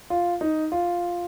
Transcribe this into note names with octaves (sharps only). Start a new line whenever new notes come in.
F4
D#4
F4